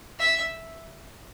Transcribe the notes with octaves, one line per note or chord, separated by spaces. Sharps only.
E5